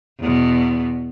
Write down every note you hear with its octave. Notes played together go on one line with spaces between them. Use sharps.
E2 B2